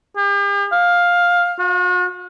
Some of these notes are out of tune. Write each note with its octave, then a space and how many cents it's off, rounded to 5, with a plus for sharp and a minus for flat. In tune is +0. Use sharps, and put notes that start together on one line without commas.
G4 +45
F5 +10
F#4 -45